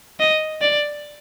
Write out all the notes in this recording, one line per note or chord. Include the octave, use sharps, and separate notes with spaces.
D#5
D5